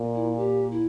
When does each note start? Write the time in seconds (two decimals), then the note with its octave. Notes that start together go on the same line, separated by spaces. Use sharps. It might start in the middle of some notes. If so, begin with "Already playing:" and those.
Already playing: A#2
0.15 E4
0.37 G4
0.72 E4